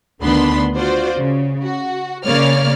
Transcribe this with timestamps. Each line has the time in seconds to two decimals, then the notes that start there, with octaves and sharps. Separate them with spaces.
0.21 D2 D#3 B3 D4 B5 C6
0.75 F4 F#4 C5 D5
1.15 C#3
1.62 F#4
2.25 C#3 A#3 C#5 D5 F6